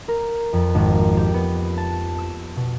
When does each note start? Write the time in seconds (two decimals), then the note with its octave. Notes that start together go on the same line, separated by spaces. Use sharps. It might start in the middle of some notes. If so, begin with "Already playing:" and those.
0.08 A#4
0.53 F2
0.75 G#1
0.91 A#3
1.17 G4
1.34 B3
1.77 A5
2.18 E6
2.56 B2